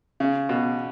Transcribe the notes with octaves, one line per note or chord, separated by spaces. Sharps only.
C#3
B2